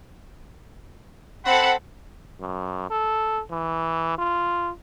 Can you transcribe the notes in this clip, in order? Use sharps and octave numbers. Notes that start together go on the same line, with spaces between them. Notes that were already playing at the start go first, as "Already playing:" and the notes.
C4 A4 F#5 B5
F#2
A4
E3
F4